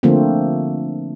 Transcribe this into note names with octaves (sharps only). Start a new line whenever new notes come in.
D3 F3 A3 A#3 C4